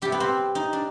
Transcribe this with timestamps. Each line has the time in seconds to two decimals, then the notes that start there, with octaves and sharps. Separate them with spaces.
0.02 C3 G3 G4
0.12 B3
0.20 C4
0.55 D#4
0.73 D4